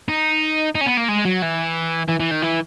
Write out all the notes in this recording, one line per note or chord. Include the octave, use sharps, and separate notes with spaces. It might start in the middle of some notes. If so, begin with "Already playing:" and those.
D#4
D#4
C#4
B3
A#3
G#3
F#3
E3
E3
E3
D#3
E3